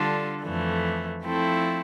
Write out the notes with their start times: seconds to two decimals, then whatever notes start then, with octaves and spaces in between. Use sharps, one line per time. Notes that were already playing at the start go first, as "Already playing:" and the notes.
Already playing: D3 G3 D4 F4 A4
0.45 F2 E3 A3
1.23 F3 A3 C4 E4 A4